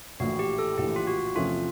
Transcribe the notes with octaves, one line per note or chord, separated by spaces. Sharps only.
A#1 A2 E3 F#4
G4
A4
A#1 A2 E3 G4
F4
F#4
E2 C3 F3 A3 C#4 F4